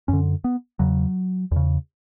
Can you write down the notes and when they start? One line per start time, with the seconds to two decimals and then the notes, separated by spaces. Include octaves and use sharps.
0.08 F#2 D3 C#4
0.44 B3
0.79 E2 C#3 F#3
1.52 E2 C#3